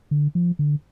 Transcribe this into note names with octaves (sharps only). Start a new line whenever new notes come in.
D3
F3
D3